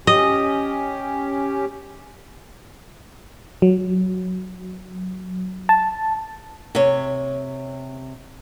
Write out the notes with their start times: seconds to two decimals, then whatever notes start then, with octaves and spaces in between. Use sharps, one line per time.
0.07 C#4 G4 D#5
3.62 F#3
5.69 A5
6.75 C3 C#5